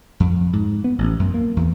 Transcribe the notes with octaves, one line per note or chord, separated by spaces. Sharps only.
F2
G#2
B3
A1
F#2
A#3
E2